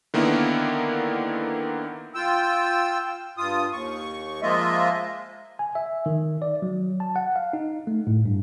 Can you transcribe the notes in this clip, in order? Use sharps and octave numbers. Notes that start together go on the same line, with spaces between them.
D3 D#3 A#3 B3 E4
F4 G5 E6
G2 F4 D#6
D#2 C#6
F3 G#3 A#3 F4 D#5 E5
G#5
E5
D#3
D5
F#3
A5
F#5
F5
D#4
A3
A2
G2